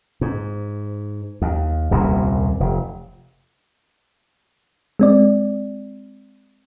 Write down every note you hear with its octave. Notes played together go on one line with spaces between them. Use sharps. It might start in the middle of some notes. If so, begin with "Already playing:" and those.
G#2
D#2
D#1 C2 F#2 A#2
F1
G#3 C4 D5